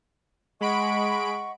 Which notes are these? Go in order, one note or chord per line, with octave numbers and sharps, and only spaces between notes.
G#3 D#5 F#5 B5 C#6 D7